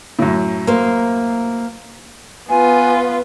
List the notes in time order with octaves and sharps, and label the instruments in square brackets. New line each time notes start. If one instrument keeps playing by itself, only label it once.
[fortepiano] F#2 A2
[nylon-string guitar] A#3 C5
[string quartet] B3 F4 B4 [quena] G#5